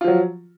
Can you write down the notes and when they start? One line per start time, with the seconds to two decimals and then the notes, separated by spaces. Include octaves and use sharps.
0.01 F4
0.04 F3
0.08 F#3